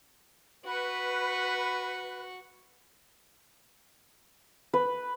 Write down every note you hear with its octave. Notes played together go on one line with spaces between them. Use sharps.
F#4 B4 C#6
B4